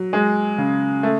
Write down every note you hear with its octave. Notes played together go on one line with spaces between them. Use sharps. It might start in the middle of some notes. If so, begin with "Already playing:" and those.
Already playing: F#3
G#3
C#3
A3